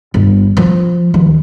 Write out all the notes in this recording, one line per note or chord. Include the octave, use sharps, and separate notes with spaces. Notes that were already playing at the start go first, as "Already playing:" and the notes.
G1
F3
D#2